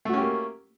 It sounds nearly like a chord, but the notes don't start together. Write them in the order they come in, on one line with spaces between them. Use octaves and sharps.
A3 F#4 C#4 G4 A#3